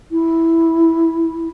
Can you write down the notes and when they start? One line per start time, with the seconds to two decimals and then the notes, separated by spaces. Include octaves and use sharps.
0.12 E4